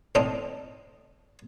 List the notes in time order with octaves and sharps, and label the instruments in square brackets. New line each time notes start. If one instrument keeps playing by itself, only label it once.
[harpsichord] A2 C4 D4 D#4 A5